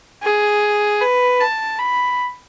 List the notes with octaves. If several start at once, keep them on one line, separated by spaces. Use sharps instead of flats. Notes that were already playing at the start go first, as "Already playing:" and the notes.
G#4
B4
A5
B5